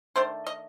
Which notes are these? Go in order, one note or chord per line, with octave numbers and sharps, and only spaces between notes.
D#3 A3 D4 C5
D#5